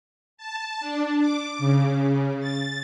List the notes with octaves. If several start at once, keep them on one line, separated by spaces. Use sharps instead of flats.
A5
D4
D6
C#3
A6